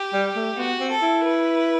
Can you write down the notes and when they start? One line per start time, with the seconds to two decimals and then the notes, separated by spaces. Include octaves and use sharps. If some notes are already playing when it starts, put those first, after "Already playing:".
Already playing: G4
0.13 G3
0.35 A3
0.57 B3 F#4
0.80 C4
0.91 A4
1.02 E4
1.25 B4